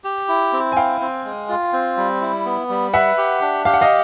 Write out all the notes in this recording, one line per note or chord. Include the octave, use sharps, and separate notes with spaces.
G4
E4
C4
G#5
E4 F5 G5
C4
G#3
F4
C4
G3
E4
B3
G3
B4 E5 F#5
G4
D4
G4 F5
F#5
D#5 F5